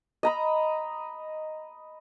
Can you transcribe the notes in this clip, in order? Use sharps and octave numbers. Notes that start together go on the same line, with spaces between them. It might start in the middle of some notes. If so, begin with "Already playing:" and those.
D#5 A#5 B5